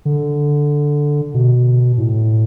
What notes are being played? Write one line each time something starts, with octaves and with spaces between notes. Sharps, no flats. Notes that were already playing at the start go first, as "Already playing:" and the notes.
D3
B2
A2